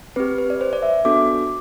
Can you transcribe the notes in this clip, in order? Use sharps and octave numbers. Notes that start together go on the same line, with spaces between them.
C4 G4 B4
B4
D5
C5
D5
E5
B3 D4 F#4 A4 D6